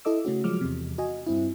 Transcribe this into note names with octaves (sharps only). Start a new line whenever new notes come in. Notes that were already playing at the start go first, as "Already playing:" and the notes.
E4 A4 D#5 D6 E6
C#3 A3 C#4 F#4
F3 F#3 G#3 D6 F6
E2 C3
F#4 D#5 G#5
G2 C4 E4